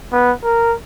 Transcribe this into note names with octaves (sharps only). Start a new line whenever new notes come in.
B3
A#4